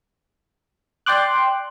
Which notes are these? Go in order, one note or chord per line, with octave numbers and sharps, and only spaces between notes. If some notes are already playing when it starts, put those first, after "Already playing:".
D5 G5 C6 D6 F#6